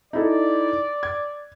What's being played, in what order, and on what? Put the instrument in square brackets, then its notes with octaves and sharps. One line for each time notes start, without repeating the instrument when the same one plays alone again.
[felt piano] D#4 E4 A4 [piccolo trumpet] D5
[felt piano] G#6